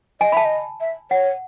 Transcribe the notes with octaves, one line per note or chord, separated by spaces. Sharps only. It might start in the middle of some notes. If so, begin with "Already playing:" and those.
D#5 G#5
E5 A5 B5
D#5
E5
C#5 F#5